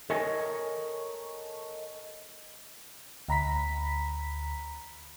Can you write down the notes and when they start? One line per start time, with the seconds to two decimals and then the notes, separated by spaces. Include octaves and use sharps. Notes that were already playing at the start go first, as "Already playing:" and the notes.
0.10 A4 A#4 C#5 D#5 G#5
3.28 D2 A#5 B5 B6